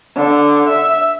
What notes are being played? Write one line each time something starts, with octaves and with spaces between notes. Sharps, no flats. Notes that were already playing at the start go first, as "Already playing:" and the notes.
D3
E5